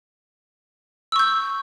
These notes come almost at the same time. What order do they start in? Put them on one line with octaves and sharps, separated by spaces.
E6 C#6 G6